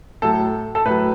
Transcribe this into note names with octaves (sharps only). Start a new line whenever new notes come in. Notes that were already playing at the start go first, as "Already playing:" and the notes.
A2 F#3 A4
A4
A2 F#3 B4